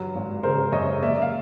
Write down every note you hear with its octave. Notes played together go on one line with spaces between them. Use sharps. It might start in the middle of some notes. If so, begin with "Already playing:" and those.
Already playing: G2 F#3
G#1
C#3 A#4 C5
F#2 C#5 D#5
A#3 D5 E5
F5